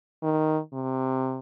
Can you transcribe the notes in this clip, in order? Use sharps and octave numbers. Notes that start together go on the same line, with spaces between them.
D#3
C3